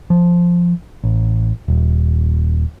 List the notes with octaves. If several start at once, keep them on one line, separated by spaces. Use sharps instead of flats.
F3
A1
D#1